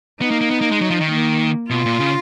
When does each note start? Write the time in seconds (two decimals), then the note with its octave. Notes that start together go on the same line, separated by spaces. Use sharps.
0.21 B3 D#4
0.31 A#3
0.41 A#3
0.51 B3
0.61 A#3
0.71 G#3
0.81 F#3
0.91 F3
1.01 D#3
1.11 A#3
1.70 B2 F4
1.86 A#2
2.00 C#3